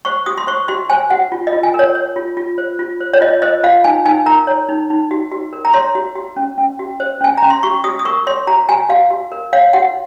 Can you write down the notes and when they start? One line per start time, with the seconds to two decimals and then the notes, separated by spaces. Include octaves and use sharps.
0.05 C5 C#6
0.26 F#4 D#6
0.38 C6
0.47 C5 C#6
0.68 F#4 C6
0.90 C5 G#5
1.10 F#4 F#5
1.32 F4
1.47 D#5
1.53 F4
1.63 G#5
1.74 A#4
1.79 C#5
1.95 C#5
2.16 F4
2.37 F4
2.58 C5
2.79 F4
3.00 C5
3.13 C#5
3.21 F4 D#5
3.42 C5 D#5
3.63 F4 F5
3.84 D#4 G#5
4.05 D#4 G#5
4.26 A#4 A#5
4.47 C#5
4.68 D#4
4.90 D#4
5.11 F#4
5.32 F#4
5.53 A#4
5.65 A#5
5.74 C#5 C6
5.95 F#4
6.15 F#4
6.36 C#4
6.58 C#4
6.79 F#4
7.00 C5
7.21 C#4 G#5
7.37 A#5
7.43 C#4
7.50 C6
7.63 F#4 C#6
7.84 F#4 D#6
7.99 D#6
8.05 A#4 C#6
8.27 C#5 C6
8.47 F#4 A#5
8.69 F#4 G#5
8.89 F#4 F5
9.10 F#4
9.32 A#4
9.53 C#5 F5
9.73 F#4 F#5